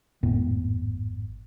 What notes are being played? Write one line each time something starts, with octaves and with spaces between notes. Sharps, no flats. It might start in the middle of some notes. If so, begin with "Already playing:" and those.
G#1 F2 A2 B3